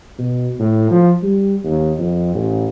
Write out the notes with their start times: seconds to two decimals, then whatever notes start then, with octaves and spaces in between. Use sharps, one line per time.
0.18 B2
0.59 A2
0.90 F3
1.22 G3
1.64 D#2
1.98 F2
2.35 A1